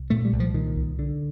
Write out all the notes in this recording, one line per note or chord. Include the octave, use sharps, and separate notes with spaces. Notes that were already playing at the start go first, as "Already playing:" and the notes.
Already playing: C2
A#2 A3
G3
C2
F3
A#2 D#3
C2
D3